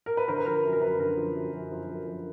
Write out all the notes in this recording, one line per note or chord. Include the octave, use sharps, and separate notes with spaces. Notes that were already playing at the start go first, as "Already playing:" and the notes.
A#4
B4
D3 A#4 C5
B4
F3 A#4
F#2
A#4
F#2 B4
D3 A#4
F3
F#2
F#2
F3
F#2
F3